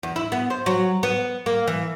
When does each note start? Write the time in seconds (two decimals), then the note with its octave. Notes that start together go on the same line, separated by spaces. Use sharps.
0.03 E2
0.16 E4
0.32 B3
0.50 C5
0.66 F#3
1.03 B3
1.46 A#3
1.67 E3